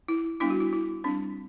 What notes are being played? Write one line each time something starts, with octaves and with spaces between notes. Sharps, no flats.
E4
G3 B3 D4 E4
F#4
E4
E4
G3 C4 D4